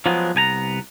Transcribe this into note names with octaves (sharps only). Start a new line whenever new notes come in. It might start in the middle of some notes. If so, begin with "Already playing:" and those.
F3 F#3 G#3 B3
C2 B3 G#5 A#5